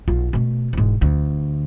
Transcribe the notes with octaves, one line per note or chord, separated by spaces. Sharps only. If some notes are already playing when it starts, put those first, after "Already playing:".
B1 F4
B2 A3
E1 G#2
D2